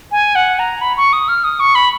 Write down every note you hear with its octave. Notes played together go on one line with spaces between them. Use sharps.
G#5
F#5
A#5
B5
C#6
D#6
F6
D#6
C#6
B5